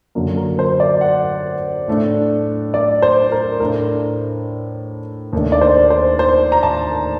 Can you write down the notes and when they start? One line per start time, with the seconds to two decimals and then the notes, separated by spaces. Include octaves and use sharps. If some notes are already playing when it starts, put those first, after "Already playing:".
0.15 F#2 D3 F#3 A#3
0.37 A#4
0.59 C5
0.80 D5
1.01 F#5
1.88 A2 A3 D4
2.74 D5
3.02 C5
3.32 A#4
3.60 A2 A3 D4 A#4
5.33 D#2 D#3 A3 D4
5.52 D5
5.61 C5
5.90 C5
6.19 C5
6.52 A#5
6.63 A5